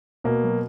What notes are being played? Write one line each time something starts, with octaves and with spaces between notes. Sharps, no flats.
B2 A#3
F#3